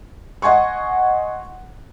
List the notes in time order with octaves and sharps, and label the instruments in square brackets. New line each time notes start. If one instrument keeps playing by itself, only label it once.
[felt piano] D#5 F#5 G#5 C6 C#6